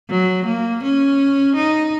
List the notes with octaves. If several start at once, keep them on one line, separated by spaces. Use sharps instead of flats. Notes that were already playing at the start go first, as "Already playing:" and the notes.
F#3
A#3
C#4
D#4